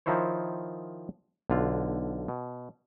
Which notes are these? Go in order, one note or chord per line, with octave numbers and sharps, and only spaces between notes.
D#3 F3 D#4 E4 C5 C#5
B1 D3 F4
B2